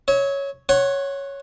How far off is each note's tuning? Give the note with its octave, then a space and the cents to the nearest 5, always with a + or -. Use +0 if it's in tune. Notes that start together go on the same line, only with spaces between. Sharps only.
C#5 +0 E5 -40
C#5 +0 F#5 +5 C6 +45